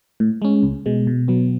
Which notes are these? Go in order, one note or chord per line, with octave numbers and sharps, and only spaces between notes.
A2
G#3 C#4
C#2
B2 G#3
B2
F#3 B3